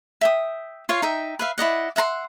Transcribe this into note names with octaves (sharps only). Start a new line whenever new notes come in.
E5 G5 D#6
F4 C#5 F5
D#4 E5 G5
B4 E5 F5
E4 D5 D#5 F#5
E5 F#5 A#5 C6